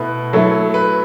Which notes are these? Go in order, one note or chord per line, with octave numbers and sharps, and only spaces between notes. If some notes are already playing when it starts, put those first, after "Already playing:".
Already playing: B2 A3 E4 B4
F#3 A3 E4 A4
B4